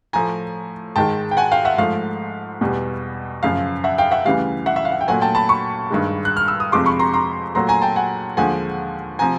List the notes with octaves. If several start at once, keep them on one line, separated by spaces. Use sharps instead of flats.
A2 F3 A3 G#5 A#5
G#2 D#3 G#3 G5 A5
G5
F#5 G#5
F5 G5
E5 F#5
G#2 F3 A3 F5
E2 B2 G3
F#2 C#3 F3 F5
E5 F#5
F5 G5
E5 F#5
D2 C#3 E3 G3 F5
E5 F#5
E5
F5
F#5
G5
A#2 F#3 A3 F#5 G#5
G5 A5
A5 B5
B5 C#6
G2 D#3 G#3
F#6
F6
E6
D#6
F2 C3 F3 G#3 C6 D6
B5 C#6
A#5 C6
A#5 C6
A#2 F#3 A3 A#5 C6
G#5 A#5
G5 A5
F#5 G#5
D#2 D3 F3 G#3 F#5 G#5
C3 F3 G#5 A#5